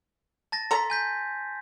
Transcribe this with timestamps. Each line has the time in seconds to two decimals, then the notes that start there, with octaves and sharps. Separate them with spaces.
0.52 A5 A6 A#6
0.71 A4 A#5 C6 B6
0.90 G#5 G6 B6